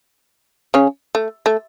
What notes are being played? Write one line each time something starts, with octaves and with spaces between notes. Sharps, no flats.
C#3 C#4
A3
A3